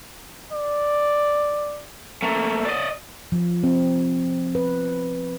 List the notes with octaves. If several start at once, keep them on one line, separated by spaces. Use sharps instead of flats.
D5
A3 A#3
D5 D#5
F3
C4
B4